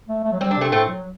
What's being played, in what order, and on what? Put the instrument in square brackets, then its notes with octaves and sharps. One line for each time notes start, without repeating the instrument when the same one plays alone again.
[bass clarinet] A3
A3
F#3
[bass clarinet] G3 [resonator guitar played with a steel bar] C4
[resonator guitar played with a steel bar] D4
[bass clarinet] C3 [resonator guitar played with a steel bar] A3 C4
[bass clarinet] A2 [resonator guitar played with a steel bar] A3 C4
[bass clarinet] F#3